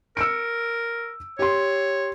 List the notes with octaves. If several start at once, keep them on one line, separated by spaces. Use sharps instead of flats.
A#4 E6 C#7 D7
G4 C#5 C6